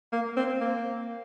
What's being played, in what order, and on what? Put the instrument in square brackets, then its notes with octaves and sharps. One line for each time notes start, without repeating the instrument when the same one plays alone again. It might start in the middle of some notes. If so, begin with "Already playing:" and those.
[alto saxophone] A#3
C4
A#3